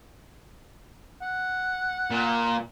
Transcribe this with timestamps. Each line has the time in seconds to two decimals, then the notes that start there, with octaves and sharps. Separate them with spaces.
1.22 F#5
2.10 A#2